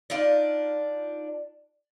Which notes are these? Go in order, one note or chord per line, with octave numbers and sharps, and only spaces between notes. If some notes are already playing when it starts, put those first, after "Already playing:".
D4 D#4 F4 D5